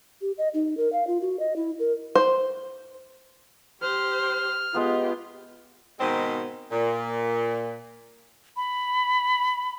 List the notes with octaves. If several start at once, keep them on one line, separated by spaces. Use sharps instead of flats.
G4
D#5
D#4
A#4
F5
F4
F#4
D#5
E4
A#4
C5
G4 C5 F6
G#3 B3 F4 G4
G#2 B2 D#3 G#3 C4 C5
A#2
B5